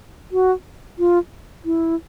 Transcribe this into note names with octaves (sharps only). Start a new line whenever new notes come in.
F#4
F4
E4